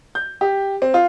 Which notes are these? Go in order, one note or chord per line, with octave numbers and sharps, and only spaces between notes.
G6
G4
C4
F4